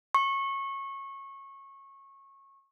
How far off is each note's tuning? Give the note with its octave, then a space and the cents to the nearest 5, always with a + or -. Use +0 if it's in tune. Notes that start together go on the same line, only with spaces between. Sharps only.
C#6 -20